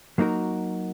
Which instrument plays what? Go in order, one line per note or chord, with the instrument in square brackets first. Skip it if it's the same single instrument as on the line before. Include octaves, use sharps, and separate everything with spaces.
[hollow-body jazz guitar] F#3 A#3 D#4 F#4 A#4